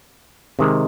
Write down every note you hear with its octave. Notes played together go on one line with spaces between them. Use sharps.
C3 D#3 G#3